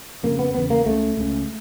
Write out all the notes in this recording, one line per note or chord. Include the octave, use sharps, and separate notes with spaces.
F2 C#3 A#3
B3
E2 C#3 B3
A#3
C#2 C#3 A3
C#2 C#3